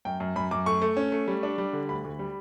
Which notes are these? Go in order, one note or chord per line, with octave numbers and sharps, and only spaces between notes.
F#2 G5
F#2
F#2 B5
F#2 D6
A3 C#6
A3
C#4
A3
G3
D4
G3
D3
D2 B5
D2
G3